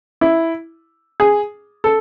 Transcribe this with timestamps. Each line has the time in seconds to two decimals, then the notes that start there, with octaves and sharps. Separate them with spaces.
0.21 E4
1.20 G#4
1.84 A4